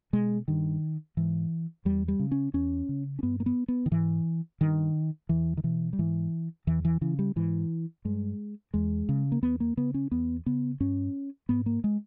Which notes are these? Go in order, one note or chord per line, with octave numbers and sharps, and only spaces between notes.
B2 G#3
G2 D#3
G#2 E3
E2 G3
G3
C#3
C#4
E2 C#4
C#3
C#4
G2 B3
A#3
B3
B3
D#3
G#2 E3
G2 D#3
E2 E3
D#3
B2 E3
G3
G#2 E3
E2 E3
E3
C#3 E3
G3
G#2 E3
G2 G#3
E2 G#3
C#3
A#3
E2 B3
A#3
C#3 B3
C#4
E2 B3
C#3 B3
G2 C#4
G#2 B3
A#3
G#3